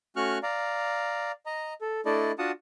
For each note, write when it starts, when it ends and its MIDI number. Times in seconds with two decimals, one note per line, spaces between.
0.16 0.38 57
0.16 0.38 61
0.16 0.38 66
0.16 0.38 85
0.16 0.38 89
0.16 0.38 90
0.43 1.32 74
0.43 1.32 77
0.43 1.32 82
1.46 1.74 75
1.46 1.74 82
1.81 2.01 69
2.05 2.32 57
2.05 2.32 62
2.05 2.32 64
2.05 2.32 69
2.05 2.32 74
2.05 2.32 75
2.39 2.51 62
2.39 2.51 65
2.39 2.51 66
2.39 2.51 78
2.39 2.51 81
2.39 2.51 87